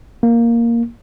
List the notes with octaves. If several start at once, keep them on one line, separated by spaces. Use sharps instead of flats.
A#3